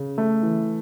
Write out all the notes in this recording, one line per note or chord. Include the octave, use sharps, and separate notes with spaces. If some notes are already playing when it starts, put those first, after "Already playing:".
Already playing: C#3
A3
E3